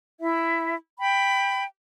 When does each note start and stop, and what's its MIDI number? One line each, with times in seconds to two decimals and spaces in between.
0.20 0.76 64
0.20 0.76 76
0.99 1.63 79
0.99 1.63 83